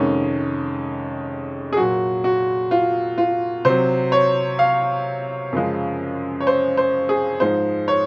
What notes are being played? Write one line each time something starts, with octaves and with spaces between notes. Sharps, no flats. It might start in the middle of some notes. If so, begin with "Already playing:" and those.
Already playing: F2 C3 D#3 G#3 C#4
G#4
A#2 F#3 F#4
F#4
F4
F4
C3 F#3 C5
C#5
F5
F#2 C#3 F3 G#3
C#5
C5
C5
G#4
G#2 F3 G#3 C5
C#5